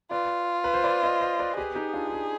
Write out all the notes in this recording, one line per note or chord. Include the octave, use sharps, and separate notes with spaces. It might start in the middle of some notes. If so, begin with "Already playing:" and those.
F4 B4 D5
B4
C5
B4 D5
C5 D#5
C5 D#5
B4 D5
G4 G#4 B4
D#4 G4
D4 F4
F4
D#4